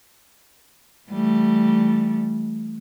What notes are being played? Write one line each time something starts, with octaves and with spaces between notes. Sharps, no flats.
E3 G3 A3